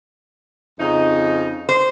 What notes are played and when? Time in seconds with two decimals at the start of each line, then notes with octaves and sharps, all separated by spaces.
0.79 F2 C#3 D#4
1.69 C5